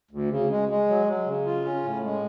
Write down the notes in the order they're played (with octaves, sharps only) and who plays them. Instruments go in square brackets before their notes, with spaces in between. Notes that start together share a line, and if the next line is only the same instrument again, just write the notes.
[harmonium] D2
C#3
G#3
G#3
F#3
F#3
C#3
F4
C#4
A2
G#3